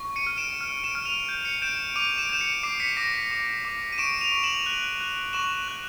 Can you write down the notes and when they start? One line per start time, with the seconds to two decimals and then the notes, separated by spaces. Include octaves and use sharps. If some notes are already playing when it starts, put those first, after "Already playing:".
Already playing: C#6
0.16 C#7 D#7
0.27 F6
0.38 D7 E7
0.61 F6
0.84 D7 E7
0.95 F6
1.05 D#7 F7
1.29 G6
1.45 C#7 D#7
1.62 G6 D7 E7
1.96 D6 D#7 F7
2.18 D7 E7
2.30 G6 E7
2.41 C#7 D#7
2.63 D6 C7 D7
2.80 B6 C#7
2.97 D6 A#6
3.14 B6
3.31 D6
3.65 D6
3.92 D#7
3.98 C#6 D7 E7
4.21 D#7 F7
4.32 C#6
4.43 E7 F#7
4.66 F#6
5.00 F#6
5.33 C#6 E7 F#7
5.68 F#6